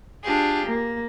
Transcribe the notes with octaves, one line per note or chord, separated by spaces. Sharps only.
D4 F4 G4 G#4
A#3